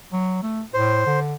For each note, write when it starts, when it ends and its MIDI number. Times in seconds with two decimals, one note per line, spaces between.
0.13 0.38 54
0.43 0.62 57
0.74 1.03 45
0.74 1.20 72
1.06 1.34 50